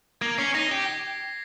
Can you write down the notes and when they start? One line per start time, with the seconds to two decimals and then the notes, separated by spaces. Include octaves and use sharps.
0.21 A#3 G#6
0.38 C#4 C7
0.55 D#4 A#6
0.71 G4